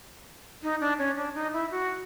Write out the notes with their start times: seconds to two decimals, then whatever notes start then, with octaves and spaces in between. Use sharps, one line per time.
0.63 D#4
0.81 D4
0.99 C#4
1.16 D4
1.35 D#4
1.53 E4
1.71 F#4